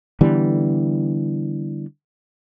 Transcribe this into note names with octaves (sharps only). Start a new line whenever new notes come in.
D3 E3 G3 B3